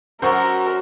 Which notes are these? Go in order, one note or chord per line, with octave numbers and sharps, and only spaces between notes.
F#2 A#4 C5 F#5 C#6